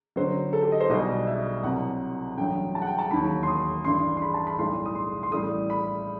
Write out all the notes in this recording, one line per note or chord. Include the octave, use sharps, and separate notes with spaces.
G1 F#2 F#3 C5
A4
G4
D#5
C5
B1 B2 G3 D#5
E5
C2 C3 F#3 F#5
A1 G2 F#3 G5
A5
F#5
G5
A5
E1 D#2 D#3 F#3 B5
C6
D#6
A1 G2 E3 G3 C6
C6
B5
A5
B5
B1 A2 G3 C6
D#6
C6
C6
A1 A2 G3 D#6
B5